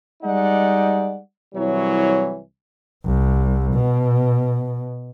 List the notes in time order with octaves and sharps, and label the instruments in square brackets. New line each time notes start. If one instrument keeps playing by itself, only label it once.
[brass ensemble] G3 G#3 D#4 D5 F#5
C2 E3 F#3 E4 C#5
[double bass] C2
B2